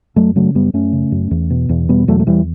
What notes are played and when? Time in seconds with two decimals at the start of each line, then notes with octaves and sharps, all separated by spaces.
0.16 F#2 F#3 A3
0.36 C#3 F#3 A3
0.55 F#2 G3 B3
0.73 F#2 A3 C#4
0.93 C#3
1.12 F#2
1.31 E2
1.50 B2
1.69 E2
1.89 B2 G3 B3
2.08 E2 F#3 A3
2.19 A3
2.27 E2 E3 G3